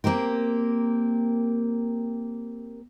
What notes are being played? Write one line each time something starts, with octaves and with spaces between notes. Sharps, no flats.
A#3 C4 G4 A#4